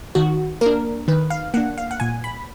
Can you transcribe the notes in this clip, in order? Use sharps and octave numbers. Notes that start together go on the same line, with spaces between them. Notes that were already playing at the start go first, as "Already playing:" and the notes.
D#3 F#4
A#3 D4 A#4
D#3 B4
F5
A#3 D4 F#5
F5
F#5
A#2 G#5
B5